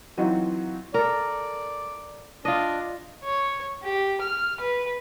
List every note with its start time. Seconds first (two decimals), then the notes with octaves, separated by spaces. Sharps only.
0.17 E3 F#3 C4 D#4 F4 F#4
0.94 A4 A#4 D5
2.45 D4 F4 D#5
3.24 C#5
3.83 G4
4.21 F6
4.60 B4